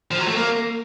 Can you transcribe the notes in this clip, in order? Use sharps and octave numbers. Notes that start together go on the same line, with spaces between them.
F3
F#3
A3
A#3